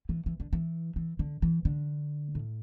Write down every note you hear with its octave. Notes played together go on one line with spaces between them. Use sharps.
E3
E3
D3
E3
E3
D3
E3
D3
A2